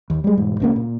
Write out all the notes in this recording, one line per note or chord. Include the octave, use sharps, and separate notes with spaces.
D#2
G3 G#3
E1 G#2
C#2 C#3 A#3
A#2